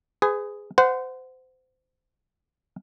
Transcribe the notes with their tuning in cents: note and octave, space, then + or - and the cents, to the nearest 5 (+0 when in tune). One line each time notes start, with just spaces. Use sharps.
G#4 +0 B4 +40
C5 -25 F#5 +0